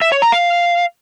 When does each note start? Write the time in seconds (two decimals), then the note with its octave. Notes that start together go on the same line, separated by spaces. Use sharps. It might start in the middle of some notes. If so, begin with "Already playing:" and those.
0.02 E5
0.12 C#5
0.22 A#5
0.32 F5